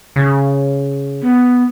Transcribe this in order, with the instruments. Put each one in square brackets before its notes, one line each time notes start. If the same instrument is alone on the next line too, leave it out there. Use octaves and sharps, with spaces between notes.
[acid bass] C#3
[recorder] B3